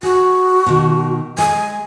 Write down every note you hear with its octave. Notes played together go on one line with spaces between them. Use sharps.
F#4 G#4
B2 D#3
G#3 G#5